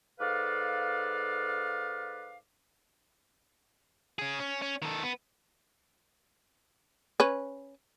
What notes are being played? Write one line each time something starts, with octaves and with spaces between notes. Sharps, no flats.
G#2 A4 B4 D5 F5
C#4 G#4
C#4
C#4
D#3 A4
B3
C#4 B4